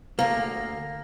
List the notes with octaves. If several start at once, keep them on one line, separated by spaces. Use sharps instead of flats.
D2 A#3